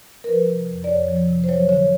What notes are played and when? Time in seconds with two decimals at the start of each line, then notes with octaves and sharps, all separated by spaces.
0.24 A#4
0.29 F3 B4
0.49 C3
0.69 F2
0.84 D5
0.89 F2 C#5
1.08 F3
1.29 C3
1.44 C5
1.49 F#3 C#5
1.69 D3 C#5